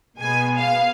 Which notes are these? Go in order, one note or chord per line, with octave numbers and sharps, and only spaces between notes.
B2 G#3 B3 G#5
F5